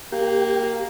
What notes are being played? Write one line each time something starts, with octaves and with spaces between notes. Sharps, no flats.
A#3 G4